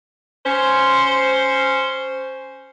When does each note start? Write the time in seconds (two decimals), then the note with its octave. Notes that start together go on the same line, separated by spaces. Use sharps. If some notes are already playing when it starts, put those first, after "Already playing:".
0.44 C#4 C5